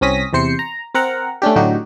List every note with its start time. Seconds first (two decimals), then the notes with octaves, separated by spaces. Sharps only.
0.01 C2 C4 C#4 D#6 A#6 B6
0.33 E2 C3 C5 C7 C#7
0.59 A#5
0.95 C4 A#4 F#5 A#5
1.42 A3 C#4 D4 G4
1.56 A2 D3 F#3 D#4 F#4 G4